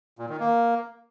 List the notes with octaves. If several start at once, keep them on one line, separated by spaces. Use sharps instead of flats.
A#2
D#3
A#3